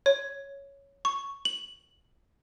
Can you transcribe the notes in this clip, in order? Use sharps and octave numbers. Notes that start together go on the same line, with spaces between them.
C#5
C#6
F#7